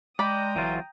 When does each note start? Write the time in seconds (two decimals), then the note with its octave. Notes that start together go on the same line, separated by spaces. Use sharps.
0.19 G#3 D5 G5 A#5 B5 D#6
0.56 G1 E3 F#3 F4